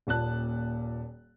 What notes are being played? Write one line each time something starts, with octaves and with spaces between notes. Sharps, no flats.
D#1 A#2 A5 F#6